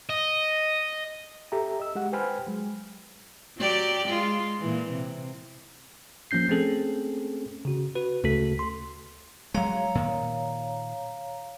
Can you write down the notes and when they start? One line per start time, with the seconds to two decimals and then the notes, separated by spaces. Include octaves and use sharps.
0.09 D#5
1.52 G4 A4 E5 A#5
1.79 D#5 E6
1.95 G#3 G4 F#5
2.12 B4 C5 G5 G#5 B5 F6
2.47 F#3 G#3
3.59 F#3 G4 D5
4.06 G#3 F4
4.60 A#2 E3
4.91 C3
6.31 F3 A#3 C#4 G6 C7
6.49 A3 C4 C#4 G#4 A4
7.65 C#3 F#4
7.95 F#4 B4
8.24 D2 C#3 A3 F#4 A4 B6
8.59 A4 C6
9.54 F#3 G#3 C#5 F5 A#5
9.95 A#2 D#3